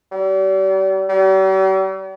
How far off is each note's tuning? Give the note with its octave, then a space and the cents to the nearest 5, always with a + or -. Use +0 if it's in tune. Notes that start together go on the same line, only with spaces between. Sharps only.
G3 -40
G3 -45